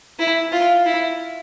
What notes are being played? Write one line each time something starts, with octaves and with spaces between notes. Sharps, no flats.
E4
F4
E4